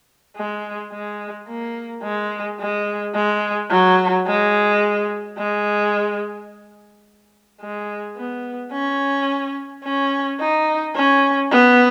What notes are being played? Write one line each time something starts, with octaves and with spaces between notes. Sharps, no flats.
G#3
G#3
A#3
G#3
G#3
G#3
F#3
G#3
G#3
G#3
B3
C#4
C#4
D#4
C#4
B3